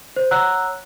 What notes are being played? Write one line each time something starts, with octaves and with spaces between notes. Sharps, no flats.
C5
C#5 F#5 A#5 E6 F#6